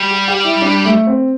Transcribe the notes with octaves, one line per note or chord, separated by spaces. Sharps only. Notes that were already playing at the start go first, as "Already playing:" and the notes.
Already playing: G3
G4
G4
E4
D4
A3
C4